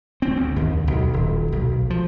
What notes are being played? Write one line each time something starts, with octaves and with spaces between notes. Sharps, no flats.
C4
D2
D#2
B1
D#1
B1
F3